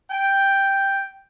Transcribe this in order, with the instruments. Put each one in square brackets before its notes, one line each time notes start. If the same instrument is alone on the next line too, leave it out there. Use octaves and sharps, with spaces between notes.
[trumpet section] G5